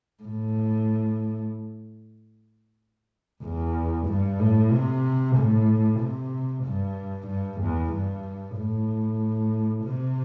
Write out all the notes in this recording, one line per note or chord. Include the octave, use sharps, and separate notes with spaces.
A2
E2
G2
A2
C3
A2
C3
G2
G2
E2
G2
A2
C3